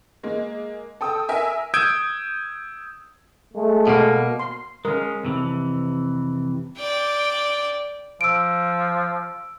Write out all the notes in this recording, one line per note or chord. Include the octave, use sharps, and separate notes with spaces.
G#3 A#3
A4 G5 D#6 E6
A#4 E5 G#5
D#6 E6 G6 G#6 D7
G#3 A3
B2 A#3
C6
G#3 C#4 A#4
F2 C3 E3
D5 G5
F3 E6 D7